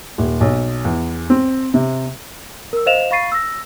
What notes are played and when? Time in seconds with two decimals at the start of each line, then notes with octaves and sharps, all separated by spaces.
0.18 D#1
0.41 B1
0.85 E2
1.30 C4
1.74 C3
2.73 A#4 E6
2.86 C5 D#5 F5 E7 F7
3.11 F5 B5 C#6 A6 C7 D#7
3.32 E6 A#6